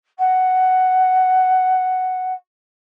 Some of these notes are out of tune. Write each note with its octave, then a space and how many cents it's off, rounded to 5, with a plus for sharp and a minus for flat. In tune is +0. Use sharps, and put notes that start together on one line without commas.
F#5 +5